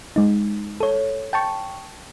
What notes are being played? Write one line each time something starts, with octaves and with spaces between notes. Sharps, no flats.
G#3 D#4
A4 C#5
G5 A5 C#6